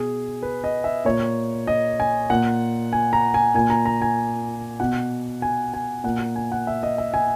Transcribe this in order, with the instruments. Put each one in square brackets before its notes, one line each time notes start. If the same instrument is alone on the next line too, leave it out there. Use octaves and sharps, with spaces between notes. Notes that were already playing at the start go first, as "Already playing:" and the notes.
Already playing: [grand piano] B2 G#4
B4
D#5
E5
A#2 C#5
D#5
G#5
A#2 F#5
G#5
A#5
G#5
A#2 G#5
A#5
A#5
G#5
B2 F#5
G#5
G#5
A#2 F#5
G#5
F#5
E5
D#5
E5
G#5